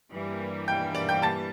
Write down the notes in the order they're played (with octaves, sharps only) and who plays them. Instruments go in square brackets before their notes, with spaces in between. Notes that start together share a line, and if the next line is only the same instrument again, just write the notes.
[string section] G2 E3 G3 A#3
[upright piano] G5 G6
D5 D6
G5 G6
A5 A6